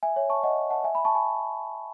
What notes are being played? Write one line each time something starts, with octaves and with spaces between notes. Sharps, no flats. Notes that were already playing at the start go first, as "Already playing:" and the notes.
E5 G#5
C#5 E5
A5 C#6
D#5 F#5
F#5 A5
E5 G#5
G#5 B5
A5 C#6
G#5 B5